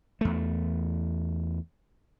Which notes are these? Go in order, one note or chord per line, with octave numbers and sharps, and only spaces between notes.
E2 A3